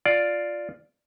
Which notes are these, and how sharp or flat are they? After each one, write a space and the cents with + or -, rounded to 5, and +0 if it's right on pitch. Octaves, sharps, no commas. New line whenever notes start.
F4 +0 D5 +0